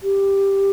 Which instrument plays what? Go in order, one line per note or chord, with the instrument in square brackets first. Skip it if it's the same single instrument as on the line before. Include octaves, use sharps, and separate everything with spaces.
[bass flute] G4